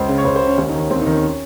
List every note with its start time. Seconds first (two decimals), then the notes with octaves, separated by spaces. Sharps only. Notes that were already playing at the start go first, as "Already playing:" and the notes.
Already playing: C#2 C5
0.08 C#3
0.18 C#5
0.25 C#2 C5
0.36 C5
0.42 C#3
0.47 C#4
0.58 D#2 C#4
0.69 D#4
0.75 D#3
0.80 C#4
0.91 D#2 C4
1.01 D#4
1.06 D#3
1.12 C#4